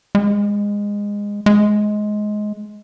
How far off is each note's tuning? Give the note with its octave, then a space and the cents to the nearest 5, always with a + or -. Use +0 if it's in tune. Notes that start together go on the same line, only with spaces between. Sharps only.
G#3 -20
G#3 +15